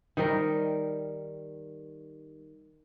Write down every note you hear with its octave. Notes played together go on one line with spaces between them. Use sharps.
D#3 G3 A#4